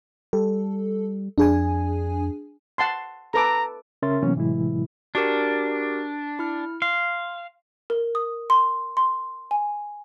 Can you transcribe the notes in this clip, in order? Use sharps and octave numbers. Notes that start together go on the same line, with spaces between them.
G3 A4
F2 D4 G#4 G#5
F#5 A5 C6
A4 B4 A#5 D6
C#3 C#4 A#4 E5 C6 A6
C3 E3 F#3 A#3 B3 C#4
A2 C3 E3 F#3 G#3 E4
D4 F#4 G4 A#4
E4 F6
F5 C6
A#4
D#6
C6
C6
G#5